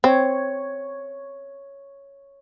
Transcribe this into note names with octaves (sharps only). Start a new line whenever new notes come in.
C4 C#5